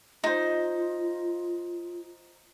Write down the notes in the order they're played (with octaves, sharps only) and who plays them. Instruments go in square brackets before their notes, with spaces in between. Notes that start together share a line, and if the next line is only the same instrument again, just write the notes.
[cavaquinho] D#4 C5 [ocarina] F4